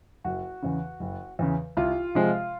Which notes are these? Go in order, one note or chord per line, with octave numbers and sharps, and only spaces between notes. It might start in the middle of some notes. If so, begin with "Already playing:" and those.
F#1 F#4
E2 C#3
F#1
E2 C#3
C2 F4
C3 F3 G#3